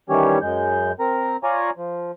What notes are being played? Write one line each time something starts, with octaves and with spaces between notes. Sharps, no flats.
D#3 E3 G3 C#4 G4 C#5
F#2 G#3 G6
C4 A#4 A#5
F4 C#5 D5 G#5 A#5
F3